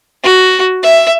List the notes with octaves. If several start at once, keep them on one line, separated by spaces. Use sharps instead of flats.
F#4
E5